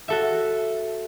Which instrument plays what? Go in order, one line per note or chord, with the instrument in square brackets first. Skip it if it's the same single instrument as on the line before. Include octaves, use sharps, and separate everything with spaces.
[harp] F#4 A4 E5